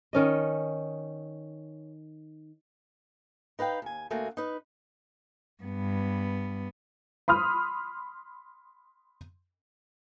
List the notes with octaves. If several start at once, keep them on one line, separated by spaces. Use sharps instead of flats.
D#3 C#4 D#5
D#4 B4 F5 G5
D#2 G#5
D2 A3 A#3 F#4 G#5
D#4 B4
G2 B3
B5 C6 D#6 F6